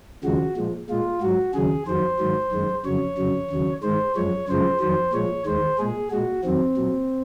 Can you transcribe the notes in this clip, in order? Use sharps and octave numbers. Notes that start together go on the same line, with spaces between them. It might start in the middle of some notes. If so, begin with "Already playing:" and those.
D#2 C#3 F3 G#3 F#4
A#2 F3 G#3
A#2 G#3 F4
G#2 F#3 F#4
D#2 C#3 F#3 G#4
F2 D#3 F#3 C5
G#2 D#3 F#3
F#2 D#3 G#3
F2 C#3 F#3 C#5
F2 C#3 F#3
D#2 C#3 F#3
G#2 D#3 G#3 C5
F#2 F3 G#3 C#5
F#2 C#3 F3 G#3 C5
F2 D#3 F#3 C5
A#2 F3 G#3 C#5
D#2 D#3 G#3 C5
A#2 G#3 G#4
A#2 G#3 F#4
F2 D#3 F#3 C4
A#2 F#3